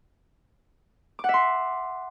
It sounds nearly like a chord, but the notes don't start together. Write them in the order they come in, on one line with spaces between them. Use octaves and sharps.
D6 F#5 E5 C6